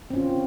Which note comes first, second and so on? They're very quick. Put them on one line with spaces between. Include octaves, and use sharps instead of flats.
C4 C#4 F4 D#3